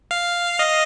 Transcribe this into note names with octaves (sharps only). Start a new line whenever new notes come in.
F5
D#5